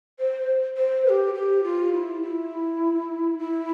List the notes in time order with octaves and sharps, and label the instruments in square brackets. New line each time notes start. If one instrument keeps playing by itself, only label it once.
[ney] C5
C5
B4
G4
G4
F4
E4
E4
E4